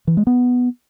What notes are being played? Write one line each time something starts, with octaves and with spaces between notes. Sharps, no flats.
E3
G#3
B3